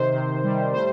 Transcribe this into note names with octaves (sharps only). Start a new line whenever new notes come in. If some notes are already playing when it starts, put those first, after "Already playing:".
Already playing: C3 D#3 C5
C3
G3
A2 C5